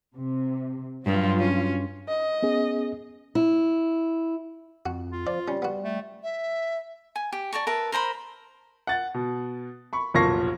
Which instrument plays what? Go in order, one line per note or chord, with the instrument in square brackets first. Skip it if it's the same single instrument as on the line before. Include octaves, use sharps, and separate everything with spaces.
[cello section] C3
[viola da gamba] G2 [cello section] F#3 F4
[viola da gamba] C#4
[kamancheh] D#5
[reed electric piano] B3 C#4 G#4
[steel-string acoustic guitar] E4
[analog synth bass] F2 [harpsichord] F#4
[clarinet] F4
[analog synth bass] F3 [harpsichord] D5
[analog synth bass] G3 [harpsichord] C#4
[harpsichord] B3 F#4
[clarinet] A3
[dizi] E5
[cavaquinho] G#5
G4
D5 A5 A#5 C#6
A#4 B4 E5 A5
A#4 C5 A#5 B5
[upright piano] F#5 A6
B2
B5 C#6
F1 B1 A#2 C#6 A#6 C7